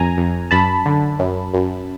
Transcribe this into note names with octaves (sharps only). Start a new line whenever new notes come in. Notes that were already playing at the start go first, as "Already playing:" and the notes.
Already playing: F2 G#5 A#5
F2
F#2 A5 B5
D3
F#2
F#2